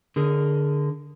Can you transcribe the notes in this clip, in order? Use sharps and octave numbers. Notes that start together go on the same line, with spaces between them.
D3 G#4 A#4